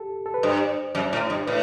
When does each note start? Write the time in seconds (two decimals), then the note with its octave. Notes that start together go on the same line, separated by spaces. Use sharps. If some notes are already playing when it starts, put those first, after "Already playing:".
Already playing: G4 A4
0.26 A4
0.34 B4
0.43 G2 C5
0.95 F#2
1.13 A2
1.30 G2
1.47 A2 B4